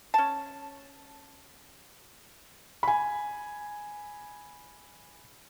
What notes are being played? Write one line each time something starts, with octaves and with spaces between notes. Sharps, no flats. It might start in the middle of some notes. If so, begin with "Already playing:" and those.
C#4 A5
G#5 B5